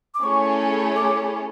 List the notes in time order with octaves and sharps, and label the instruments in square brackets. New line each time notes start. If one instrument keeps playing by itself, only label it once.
[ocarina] D6
[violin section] A3 C#4 E4 G#4 C#5 [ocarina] C#6
[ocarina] D6